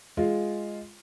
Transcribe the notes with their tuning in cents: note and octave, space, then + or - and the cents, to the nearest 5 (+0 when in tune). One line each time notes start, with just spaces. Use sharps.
G#3 +0 F4 +0